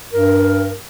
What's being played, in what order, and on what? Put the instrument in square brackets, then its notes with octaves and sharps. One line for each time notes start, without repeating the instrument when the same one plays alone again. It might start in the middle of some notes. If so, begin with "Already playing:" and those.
[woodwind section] G2 A#4